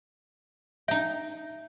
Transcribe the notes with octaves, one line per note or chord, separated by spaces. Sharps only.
D#4 E5 G5